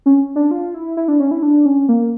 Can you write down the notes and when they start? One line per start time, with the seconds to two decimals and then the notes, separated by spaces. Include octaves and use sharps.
0.06 C#4
0.36 D4
0.51 F4
0.74 E4
0.97 E4
1.08 D4
1.20 C#4
1.31 E4
1.43 D4
1.66 C#4
1.89 A#3